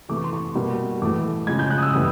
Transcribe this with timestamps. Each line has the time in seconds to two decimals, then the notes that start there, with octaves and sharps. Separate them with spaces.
0.09 C3 E3 A3 D6
0.16 C#6
0.24 C6
0.33 C#6
0.55 B2 G3 A#3
1.02 A2 E3 A3 D6
1.47 C#3 F3 G#3 G#6
1.59 G6
1.71 F#6
1.78 D#6
1.83 E6
1.93 A2 E3 G3 D#6